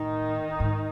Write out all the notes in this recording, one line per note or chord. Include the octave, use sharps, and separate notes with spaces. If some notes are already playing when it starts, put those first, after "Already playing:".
Already playing: A2 D#3 D#4
G#2